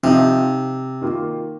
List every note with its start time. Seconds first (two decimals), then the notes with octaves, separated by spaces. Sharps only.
0.03 C3 F3 C4 D#4
1.01 D#3 A#3 F4